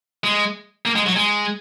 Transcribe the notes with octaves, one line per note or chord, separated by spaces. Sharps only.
G#3
A#3
G#3
F#3
G#3